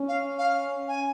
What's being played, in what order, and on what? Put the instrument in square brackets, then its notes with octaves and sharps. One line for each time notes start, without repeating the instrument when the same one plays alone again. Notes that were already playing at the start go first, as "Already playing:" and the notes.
Already playing: [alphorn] C#4
[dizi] F5
F5
G#5